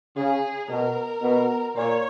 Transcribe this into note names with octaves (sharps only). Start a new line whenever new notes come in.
C#3 G#4
B2 A#4
B2
A#2 C#5